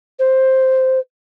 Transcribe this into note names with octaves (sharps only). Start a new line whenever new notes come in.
C5